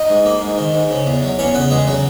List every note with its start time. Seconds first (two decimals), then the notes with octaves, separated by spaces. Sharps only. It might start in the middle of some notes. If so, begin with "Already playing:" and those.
Already playing: D#4 D#5
0.09 G#2
0.25 A#3
0.41 G#2
0.58 D#3
0.74 G#2
0.91 C#3
1.06 E2
1.22 F#3
1.39 E2 C#4 C#5
1.54 C#3 B3 B4
1.71 E2 G#3 G#4
1.87 C#3 F#3 F#4